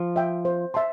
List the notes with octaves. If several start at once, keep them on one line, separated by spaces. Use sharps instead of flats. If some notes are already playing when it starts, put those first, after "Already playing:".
Already playing: F3
E5 G5
C5
E5 A5 C6